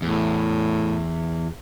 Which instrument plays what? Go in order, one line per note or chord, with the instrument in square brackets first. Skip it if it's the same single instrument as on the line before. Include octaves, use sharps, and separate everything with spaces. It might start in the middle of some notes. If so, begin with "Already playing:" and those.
[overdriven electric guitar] E2 [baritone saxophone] A2